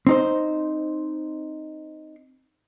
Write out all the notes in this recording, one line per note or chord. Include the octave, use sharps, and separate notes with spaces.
C4 D#4 C5